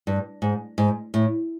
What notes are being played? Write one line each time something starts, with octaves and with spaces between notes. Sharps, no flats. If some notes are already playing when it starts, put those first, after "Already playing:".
G2
G#2
G#2
A2